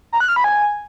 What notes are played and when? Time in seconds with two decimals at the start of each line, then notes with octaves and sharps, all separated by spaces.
0.12 A#5
0.20 F#6
0.28 F6
0.36 B5
0.44 G#5